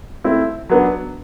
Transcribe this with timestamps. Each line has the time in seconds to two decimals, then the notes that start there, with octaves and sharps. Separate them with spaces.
0.24 A3 C4 E4
0.69 F#3 B3 D4